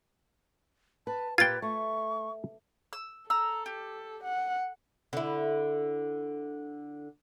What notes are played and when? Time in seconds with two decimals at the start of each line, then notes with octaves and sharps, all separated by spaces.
1.07 B4 A5
1.38 A#2 F4 G4 B4 G5 G#6 A6
1.62 A3 C#6
2.93 E6
3.30 A4 A#5 E6
3.66 G4
4.23 F#5
5.13 D3 E4